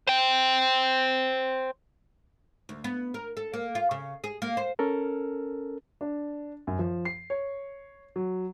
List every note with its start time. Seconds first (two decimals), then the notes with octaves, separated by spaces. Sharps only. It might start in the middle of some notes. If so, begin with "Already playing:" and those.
0.07 C5 G5
2.69 D2
2.84 B3
3.14 A#4
3.37 A4
3.54 A#3
3.75 F4
3.91 C#3
4.24 G#4
4.42 A#3
4.57 C5
4.79 C#4 A4 A#4
6.01 D4
6.67 F#2
6.79 F3
7.05 C7
7.30 C#5
8.16 F#3